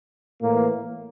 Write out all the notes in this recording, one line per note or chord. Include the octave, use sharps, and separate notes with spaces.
A2 E3 A#3